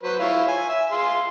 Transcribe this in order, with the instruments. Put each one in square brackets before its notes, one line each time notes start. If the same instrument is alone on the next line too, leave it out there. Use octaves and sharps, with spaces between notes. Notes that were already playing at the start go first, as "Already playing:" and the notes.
[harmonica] F#3 B4 C5
E4 F4 C#5
G#5
E5
G#4 F5 C6